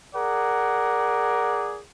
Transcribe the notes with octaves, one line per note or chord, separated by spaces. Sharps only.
G#4 A#4 D5 F#5